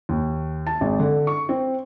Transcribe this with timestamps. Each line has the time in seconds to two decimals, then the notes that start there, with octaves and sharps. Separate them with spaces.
0.09 D#2
0.67 A5
0.81 G#1
1.00 D3
1.27 C#6
1.49 C4